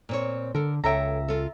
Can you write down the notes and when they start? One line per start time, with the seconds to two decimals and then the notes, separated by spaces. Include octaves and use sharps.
0.09 A#2 C4 C#5
0.55 D3 A4 A#4
0.84 C#2 A4 C#5 E5 G5 A#5
1.28 F4 A4